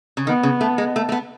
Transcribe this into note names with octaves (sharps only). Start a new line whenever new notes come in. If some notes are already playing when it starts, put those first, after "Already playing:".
C#3
D#3 B3
C#3
A3
G#3
A3
A3
B3